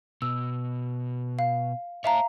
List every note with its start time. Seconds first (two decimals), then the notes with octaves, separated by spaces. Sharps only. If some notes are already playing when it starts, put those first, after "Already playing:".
0.22 B2 E6
1.39 F5
2.04 C#5 E5 F5 A5 A#5